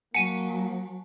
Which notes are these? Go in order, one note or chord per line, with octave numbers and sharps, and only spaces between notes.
F#3 A#3 F#5 G#5 A5 C#7 D#7